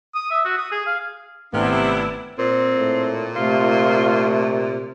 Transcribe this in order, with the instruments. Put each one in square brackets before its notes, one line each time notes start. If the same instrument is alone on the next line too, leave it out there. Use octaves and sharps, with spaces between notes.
[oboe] D#6
E5
F#4
D#6
G#4
F5
[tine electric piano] G#1 A3 F6 [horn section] C3 [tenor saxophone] B3 [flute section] D4 E4
[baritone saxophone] A#2 [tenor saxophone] C4
[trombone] A2
[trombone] C3 [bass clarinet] A3 [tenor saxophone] F4